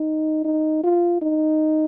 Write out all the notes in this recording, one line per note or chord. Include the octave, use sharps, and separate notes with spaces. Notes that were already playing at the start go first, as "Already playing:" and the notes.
Already playing: D#4
D#4
F4
D#4